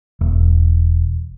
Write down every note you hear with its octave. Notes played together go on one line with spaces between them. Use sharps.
E1